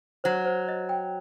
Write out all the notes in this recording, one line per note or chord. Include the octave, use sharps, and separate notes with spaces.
F#3 C5
C5
D#5
G5